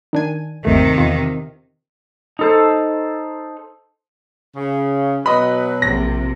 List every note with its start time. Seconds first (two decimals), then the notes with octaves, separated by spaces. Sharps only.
0.13 D#3 D4 G#5
0.65 G1 D#2 C3 D#3 A3
0.98 E2 F4
2.39 D#4 A4 C5
4.56 C#3
5.26 B2 F#3 B4 D#5 B5
5.82 A#1 C3 A#6